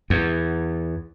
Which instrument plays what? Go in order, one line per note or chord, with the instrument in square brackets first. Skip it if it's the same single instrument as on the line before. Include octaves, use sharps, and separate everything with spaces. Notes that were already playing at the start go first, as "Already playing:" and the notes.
[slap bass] E2